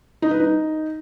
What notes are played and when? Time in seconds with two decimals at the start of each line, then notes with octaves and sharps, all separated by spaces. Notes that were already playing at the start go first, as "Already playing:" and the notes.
0.22 D#4
0.31 B4
0.40 D#4